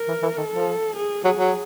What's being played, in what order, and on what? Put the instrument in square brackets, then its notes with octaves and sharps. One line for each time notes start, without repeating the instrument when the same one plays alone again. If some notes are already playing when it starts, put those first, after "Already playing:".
Already playing: [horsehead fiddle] A#4
[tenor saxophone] E3
E3
[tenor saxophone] D#3 [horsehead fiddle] A4
[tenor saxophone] F3
[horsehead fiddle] G#4
[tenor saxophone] F#3 [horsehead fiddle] G#4
[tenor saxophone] F#3